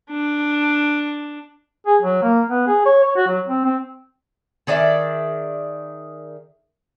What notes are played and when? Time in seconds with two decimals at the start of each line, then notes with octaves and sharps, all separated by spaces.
0.10 D4
1.86 G#4
2.02 F#3
2.23 A#3
2.50 B3
2.67 G#4
2.85 C#5
3.04 C#5
3.16 F#4
3.28 F#3
3.48 C4
3.65 C4
4.67 D#3 G#4 D5 E5